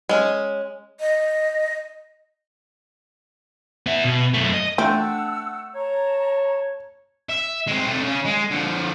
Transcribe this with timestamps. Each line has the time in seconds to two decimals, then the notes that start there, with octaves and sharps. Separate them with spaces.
0.09 G#3 C#4
1.00 D#5
3.86 B3 E5
4.05 B2
4.34 F#2 A3
4.54 D#5
4.78 A3 C4 D4 F#5 E6
5.75 C#5 A5 A#5
7.29 E5
7.67 G#3 C4
7.87 C3 A3
8.02 C#3 C#4
8.25 G#3
8.51 D3 F3